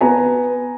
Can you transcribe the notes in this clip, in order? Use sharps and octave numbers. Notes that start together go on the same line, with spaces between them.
B3 G#5 A#5